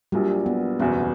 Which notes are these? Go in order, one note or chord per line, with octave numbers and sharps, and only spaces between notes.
A#1 A#2 F#3 G3
B3
F#1 E2 B2 B3